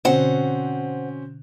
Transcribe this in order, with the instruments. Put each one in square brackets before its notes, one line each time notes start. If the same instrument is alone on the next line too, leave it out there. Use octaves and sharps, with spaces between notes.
[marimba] B2 D3 [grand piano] C4 C#4 F#4 [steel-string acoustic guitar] C5 F#5